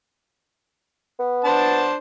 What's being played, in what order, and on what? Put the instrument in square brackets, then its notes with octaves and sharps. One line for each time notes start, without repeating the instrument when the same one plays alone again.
[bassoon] B3
[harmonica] D4 C5 A5